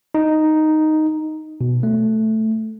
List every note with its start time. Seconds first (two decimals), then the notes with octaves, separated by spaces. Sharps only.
0.14 D#4
1.61 B2
1.83 A3